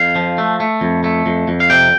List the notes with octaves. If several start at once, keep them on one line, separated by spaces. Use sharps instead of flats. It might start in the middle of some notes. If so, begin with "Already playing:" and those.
Already playing: F2 F5
F3
A3
A3
F2
A3
F2
F2
F5
C3 G5